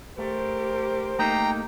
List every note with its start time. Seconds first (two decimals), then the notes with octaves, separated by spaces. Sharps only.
0.19 A3 G4 A#4 C5
1.19 A3 A#3 D#4 G5 A#5